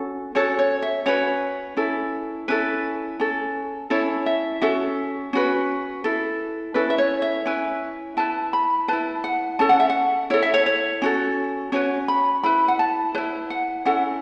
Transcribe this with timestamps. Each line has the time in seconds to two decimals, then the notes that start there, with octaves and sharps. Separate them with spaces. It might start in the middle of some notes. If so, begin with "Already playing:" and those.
Already playing: C#4 F#4 A4
0.35 C#4 F#4 A4 C#5
0.59 C#5
0.82 E5
1.06 C#4 F#4 B4 C#5
1.77 C#4 E4 A4
2.48 C#4 E4 A4 B4
3.20 C#4 A4
3.90 C#4 E4 A4 C#5
4.26 E5
4.61 C#4 F#4 A4 E5
5.33 C#4 F#4 B4
6.04 E4 A4
6.74 C#4 E4 A4 B4
6.90 E5
6.98 C#5
7.22 E5
7.46 C#4 E4 B4
8.17 E4 B4 A5
8.53 B5
8.88 E4 B4 A5
9.24 F#5
9.59 C#4 A4 A5
9.69 F#5
9.80 E5
9.90 F#5
10.30 E4 A4 C#5
10.42 E5
10.54 C#5
10.66 C#5
11.02 C#4 F#4 A4
11.72 C#4 F#4 B4 C#5
12.08 B5
12.43 E4 B4 B5
12.68 F#5
12.79 A5
13.15 B4 C#5
13.18 E4
13.50 F#5
13.85 C#4 E4 A4 F#5